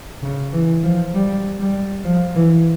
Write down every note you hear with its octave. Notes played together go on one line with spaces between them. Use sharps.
C#3
E3
F3
G3
G3
F3
E3